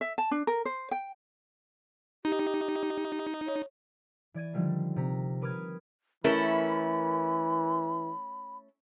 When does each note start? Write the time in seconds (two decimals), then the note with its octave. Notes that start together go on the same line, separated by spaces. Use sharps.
0.01 E5
0.18 A5
0.31 D4
0.47 A#4
0.65 C5
0.91 G5
2.25 D#4 G4
3.47 C#5
4.34 E3 D5 G#6 D#7
4.53 D3 D#3 F3 G3 A3 A#3
4.96 C3 A#5 B6
5.41 A#4 B4 D6 D#6 F6 G#6
6.24 E3 A3 C#4 E4 A#4 B5